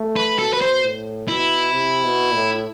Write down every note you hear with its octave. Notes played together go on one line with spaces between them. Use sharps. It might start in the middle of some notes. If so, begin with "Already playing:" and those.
Already playing: A3
B4
B2 A4
B4
C5
A2
B2 E4
C3
B2
A2